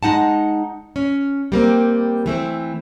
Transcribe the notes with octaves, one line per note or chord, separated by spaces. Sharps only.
G#3 D#4 F#5 A5
C#4
G3 A#3 C4
E3 A3 C4